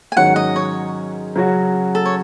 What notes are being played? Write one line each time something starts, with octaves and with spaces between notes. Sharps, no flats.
G#5
G#2 D#3 F#3 C#4 F#4 F#5
D#5
C#5
C#3 F#3 C#4 F#4
A4
C#5